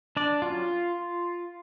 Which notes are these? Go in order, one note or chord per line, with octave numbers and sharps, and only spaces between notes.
D4 D5
F#3 C#4 F4